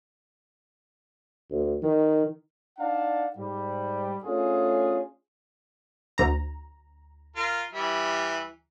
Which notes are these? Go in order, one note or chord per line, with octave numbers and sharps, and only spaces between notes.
D2
D#3
D4 D#4 D5 F5 F#5 A5
G#2 G3
A3 C#4 D4 F4 G#4
D2 A#5
F4 A#4
E3 G3 E4